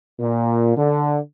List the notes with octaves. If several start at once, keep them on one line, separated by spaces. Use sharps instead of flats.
A#2
D3